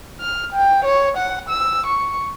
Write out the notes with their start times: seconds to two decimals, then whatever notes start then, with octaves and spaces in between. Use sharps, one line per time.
0.21 F6
0.53 G5
0.85 C#5
1.17 F#5
1.49 E6
1.86 C#6